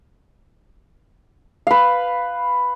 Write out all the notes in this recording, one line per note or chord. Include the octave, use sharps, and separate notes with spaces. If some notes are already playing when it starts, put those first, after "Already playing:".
B4 F5